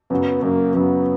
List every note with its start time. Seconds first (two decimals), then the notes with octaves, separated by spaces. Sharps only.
0.10 F#2 C#3 F#3 B3
0.42 F#2 C#3 F#3 A#3
0.75 F#2 C#3 F#3 B3